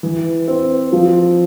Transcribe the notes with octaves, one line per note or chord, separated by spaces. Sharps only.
E3
C4
F3